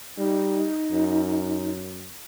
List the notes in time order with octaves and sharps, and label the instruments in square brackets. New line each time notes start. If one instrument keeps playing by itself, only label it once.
[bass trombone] G3 [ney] D#4
[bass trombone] F#2